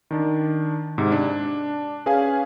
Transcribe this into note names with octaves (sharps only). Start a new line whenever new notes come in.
D#3 D4
G#2 C3
D4
C#4 G#4 B4 F5 G#5